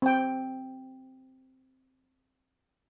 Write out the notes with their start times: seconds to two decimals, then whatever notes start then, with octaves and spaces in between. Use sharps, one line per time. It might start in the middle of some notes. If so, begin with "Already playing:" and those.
0.02 C4 G5